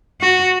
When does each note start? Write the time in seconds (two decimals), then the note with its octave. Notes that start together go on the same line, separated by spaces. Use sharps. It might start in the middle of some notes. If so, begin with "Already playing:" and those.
0.21 F#4